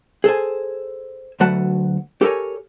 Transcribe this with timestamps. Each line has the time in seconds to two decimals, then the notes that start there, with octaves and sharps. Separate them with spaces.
0.24 G#4 A4 C5 G#5
1.40 D2 F#3 A3 B4 F#5 A5
2.21 G4 A4 A#4 C#5 G#5